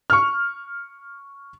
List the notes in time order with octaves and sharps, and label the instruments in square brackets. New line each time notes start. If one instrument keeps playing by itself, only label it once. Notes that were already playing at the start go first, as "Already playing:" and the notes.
[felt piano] C#6 F6